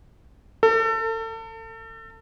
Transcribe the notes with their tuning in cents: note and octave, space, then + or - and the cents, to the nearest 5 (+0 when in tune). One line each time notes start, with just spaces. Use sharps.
A4 +35